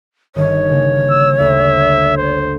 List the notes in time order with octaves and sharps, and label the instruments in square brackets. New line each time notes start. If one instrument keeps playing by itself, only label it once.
[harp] G1 D#3 [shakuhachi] C#5
[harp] C#3 A#3
[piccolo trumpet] E6
[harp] D2 [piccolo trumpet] E5
[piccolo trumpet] C5